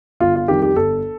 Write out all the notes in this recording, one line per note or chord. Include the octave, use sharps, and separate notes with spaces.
G1 F4
F4
F2 D#3 G3 G4
G4
G1 A4